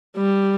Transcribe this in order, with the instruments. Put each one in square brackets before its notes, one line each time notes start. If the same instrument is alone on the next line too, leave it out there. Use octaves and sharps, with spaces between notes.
[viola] G3